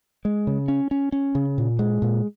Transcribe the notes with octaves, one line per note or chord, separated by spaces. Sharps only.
G#3
C#3
C#4
C#4
C#4
C#3
A#2
G#3
A#2